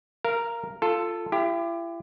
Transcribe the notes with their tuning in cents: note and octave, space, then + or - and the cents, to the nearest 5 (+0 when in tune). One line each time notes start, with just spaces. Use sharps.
A#4 +0 F5 -25
F4 -5 A4 +10
E4 +40 G4 +15